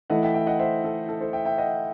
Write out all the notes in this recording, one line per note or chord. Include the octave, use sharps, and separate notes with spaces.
E3 A3 E4 D#5 F#5
E5 G5
E5 G5
D#5 F#5
C5 E5
A4
A4
A4 C5
E5 G5
E5 G5
D#5 F#5